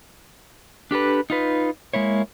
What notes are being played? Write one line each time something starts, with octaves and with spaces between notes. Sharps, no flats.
D4 G4 A4 B4
D#4 F4 B4
G#3 A#3 E4 C#5